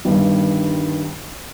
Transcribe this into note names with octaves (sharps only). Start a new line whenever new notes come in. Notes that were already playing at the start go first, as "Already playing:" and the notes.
G1 G2 D#3 G3